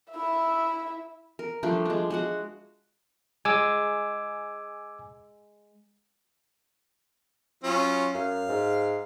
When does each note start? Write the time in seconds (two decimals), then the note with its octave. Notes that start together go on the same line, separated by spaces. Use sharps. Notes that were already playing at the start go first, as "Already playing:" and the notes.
0.12 E4 E5
1.39 A#4
1.63 F3 G3 A3 D4
1.85 G#3 D4
2.10 G#3 F#4 F#5
3.45 G#3 G#5 D6 E6
7.64 F#3 C#4 F4
8.14 F#2 F5
8.49 G#2